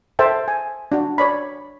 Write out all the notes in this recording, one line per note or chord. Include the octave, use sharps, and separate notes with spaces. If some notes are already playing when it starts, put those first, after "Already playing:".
A4 C5 E5 G5 A5
G#5
D4 F#4
C#5 D5 B5